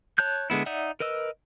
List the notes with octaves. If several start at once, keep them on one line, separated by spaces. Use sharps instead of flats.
C#5 A5 F#6 G6
D3 G#3 B3 E4
D#4 D5 E5 F#5
A#4 B4 D#5 E6